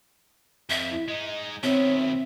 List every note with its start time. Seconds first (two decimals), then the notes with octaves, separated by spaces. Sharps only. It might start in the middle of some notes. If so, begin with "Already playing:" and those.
0.70 F2 E5
0.91 E4
1.08 G#3 D#4 D#5
1.63 B2 D#3 C4 C#5 E5